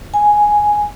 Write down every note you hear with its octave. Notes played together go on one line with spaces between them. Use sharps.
G#5